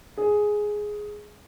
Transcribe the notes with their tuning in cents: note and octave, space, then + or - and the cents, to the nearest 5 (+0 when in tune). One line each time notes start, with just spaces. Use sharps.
G#4 +5